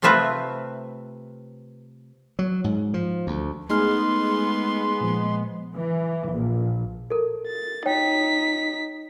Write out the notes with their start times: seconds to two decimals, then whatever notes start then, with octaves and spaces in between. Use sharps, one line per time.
0.02 C3 A3 C4 F4 B4 E5
2.39 F#3
2.64 G#2
2.94 F3
3.27 D2
3.70 G#3 A3 B3 D#4 C6 F6
5.01 A#2 F3
5.74 E3
6.30 A#1
7.10 A4 A#4
7.47 A6
7.86 D#4 C#5 G5 B6